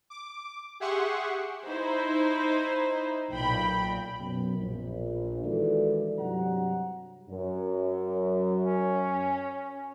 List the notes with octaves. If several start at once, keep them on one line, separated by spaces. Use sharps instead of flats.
D6
G4 G#4 E5 F#5 C6 C#6
D#4 E4 C5
B1 A#2 G5 B5
F#2 B2
A#1
D#3 E3 G#3 F#4 A4 D5
G2 C3 F#3 G3 F#5 A#5
F#2
C#4